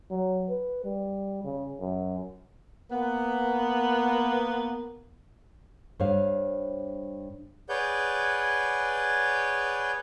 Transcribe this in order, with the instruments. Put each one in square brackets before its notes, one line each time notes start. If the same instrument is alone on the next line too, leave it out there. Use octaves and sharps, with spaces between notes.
[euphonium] F#3
B4
G3
C#3
F#2
[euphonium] A#3 [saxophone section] B3
[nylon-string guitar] G2 C5 C#5 F5
[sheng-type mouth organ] G#4 B4 C#5 D5 F#5 G6